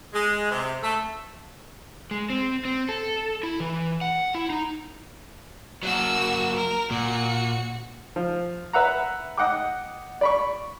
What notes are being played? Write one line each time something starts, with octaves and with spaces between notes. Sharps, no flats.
G#3
C3
A3
G#3
C4
C4
A4
E4
E3
F#5
E4
D#4
F#3 A#3 F#4 E6
A#4
A#2 F#4 C#7
F3
B4 E5 F#5 A#5
D#5 F#5 G5 D6
D5 B5 C#6